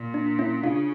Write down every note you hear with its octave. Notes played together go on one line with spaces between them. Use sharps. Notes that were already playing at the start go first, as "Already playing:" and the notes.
Already playing: A#2
D4
C#4 E4
C#3 D4 F4